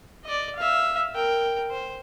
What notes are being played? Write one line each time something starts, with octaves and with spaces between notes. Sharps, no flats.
D5 D#5
E5 F5
A#4 G5
C5